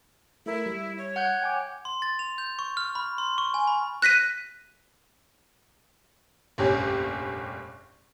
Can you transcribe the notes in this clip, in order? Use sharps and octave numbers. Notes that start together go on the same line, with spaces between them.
A3 E4 A#4
G3
C#5
F#5 F#6 G6
G5 G#5 D6
C6
A6
F7
G6
C#6
F6
B5
C6
C#6
G#5
B5
F#6 A#6 B6 D#7
F1 A#1 G2 C#4 G4